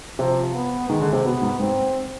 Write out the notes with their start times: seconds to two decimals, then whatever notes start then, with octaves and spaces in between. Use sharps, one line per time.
0.19 C3 F3
0.54 B3
0.89 D#3 G#3
1.01 D3
1.13 C3
1.25 B2 B3
1.42 G#2
1.60 G#2 C4